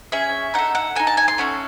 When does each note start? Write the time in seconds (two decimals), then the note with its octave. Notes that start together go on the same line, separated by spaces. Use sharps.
0.12 C#4 G#4 E5
0.54 D#4 A4 F#5
0.75 F#5
0.95 D#4 A4 G#5
1.07 A5
1.17 G#5
1.28 C6
1.38 A3 C#4 F#4 A4